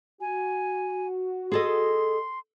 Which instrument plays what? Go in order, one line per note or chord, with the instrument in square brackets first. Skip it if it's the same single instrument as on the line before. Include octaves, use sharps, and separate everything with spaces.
[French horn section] F#4 [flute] G#5
[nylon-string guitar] G#4 A4 D#5 [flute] C6